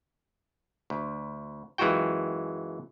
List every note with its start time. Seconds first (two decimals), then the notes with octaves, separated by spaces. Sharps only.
0.90 D2
1.78 F#2 E3 G#3 F4 F#4 G5